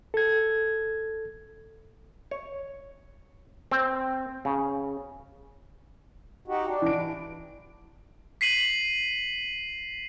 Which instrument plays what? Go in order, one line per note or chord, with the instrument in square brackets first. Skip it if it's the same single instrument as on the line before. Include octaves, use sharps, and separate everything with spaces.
[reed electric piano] A4 G#6
[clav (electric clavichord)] C#5
C4
C#3
[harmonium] D#4 F#4 G4
D4
[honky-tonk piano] E3 D7
[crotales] B6 C7 D#7 F#7